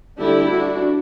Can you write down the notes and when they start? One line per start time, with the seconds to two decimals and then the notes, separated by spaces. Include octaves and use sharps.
0.19 D3 G3 D4 E4 G4
0.50 D4 F#4